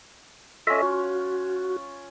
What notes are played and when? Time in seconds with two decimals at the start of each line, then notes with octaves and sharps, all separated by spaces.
0.67 C#4 F4 A4 D#5 E5
0.83 F#4